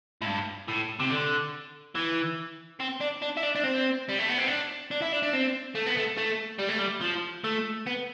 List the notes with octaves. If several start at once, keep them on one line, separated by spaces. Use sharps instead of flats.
A2
G2
A2
C3
D3
E3
C4
D4
D4
E4
D4
D4
C4
G3
A3
B3
C4
D4
D4
E4
D4
D4
C4
A3
B3
A3
A3
G3
A3
G3
F3
A3
B3